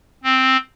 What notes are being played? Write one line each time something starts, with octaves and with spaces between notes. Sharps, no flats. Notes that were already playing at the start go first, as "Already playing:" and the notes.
C4